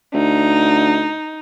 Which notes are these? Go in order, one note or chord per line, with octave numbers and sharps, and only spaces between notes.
D2 D#4